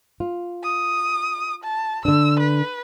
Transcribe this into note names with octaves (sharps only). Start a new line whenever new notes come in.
F4
D#6
A5
D3 D4 E6
B4